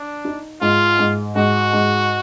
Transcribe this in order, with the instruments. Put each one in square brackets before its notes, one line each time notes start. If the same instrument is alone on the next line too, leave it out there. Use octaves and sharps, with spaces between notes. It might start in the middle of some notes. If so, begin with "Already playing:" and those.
Already playing: [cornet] D4
[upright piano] D#4
[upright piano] G#2 [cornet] F4
[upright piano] G#2
[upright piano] G#2 [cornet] F#4
[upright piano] G#2